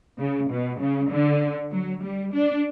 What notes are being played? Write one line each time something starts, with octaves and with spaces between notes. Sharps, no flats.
C#3
B2
C#3
D3
F#3
G3
D4